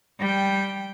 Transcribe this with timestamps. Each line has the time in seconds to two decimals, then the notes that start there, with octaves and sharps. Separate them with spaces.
0.19 G3 G5